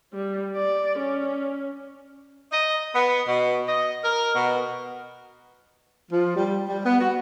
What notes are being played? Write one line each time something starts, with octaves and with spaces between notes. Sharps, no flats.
G3
D5
C#4
D#5
B3
B2
D#5
A#4
B2
F3
G3
G3
B3
F#4